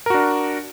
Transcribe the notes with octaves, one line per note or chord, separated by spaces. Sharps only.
D4 F#4 A#4